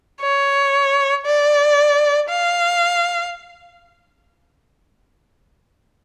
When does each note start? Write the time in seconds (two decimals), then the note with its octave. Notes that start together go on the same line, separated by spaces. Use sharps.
0.21 C#5
1.26 D5
2.30 F5